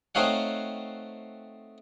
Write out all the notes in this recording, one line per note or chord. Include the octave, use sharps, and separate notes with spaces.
A3 C4 D#4 C#5 F5 F#5